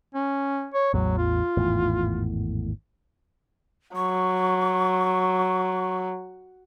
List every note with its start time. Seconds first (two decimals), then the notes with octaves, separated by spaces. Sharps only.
0.14 C#4
0.74 C#5
0.94 A1 E2 F#3
1.18 F4
1.57 G#1 E2 A2
3.95 F#3 C#6